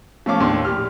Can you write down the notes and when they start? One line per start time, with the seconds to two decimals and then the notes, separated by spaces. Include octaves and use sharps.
0.26 F3 A3 C#4 F5 D6
0.40 D#2 A2 D4 C6
0.65 A#1 G4 F6